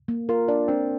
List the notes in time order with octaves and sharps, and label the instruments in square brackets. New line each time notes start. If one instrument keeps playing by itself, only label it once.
[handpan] A#3
[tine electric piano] F4 [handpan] A#4
[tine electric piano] D4 [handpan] D5
[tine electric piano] C4 [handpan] D4